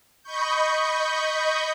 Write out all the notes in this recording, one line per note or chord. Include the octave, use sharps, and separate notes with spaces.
D#5 B5 C#6 G6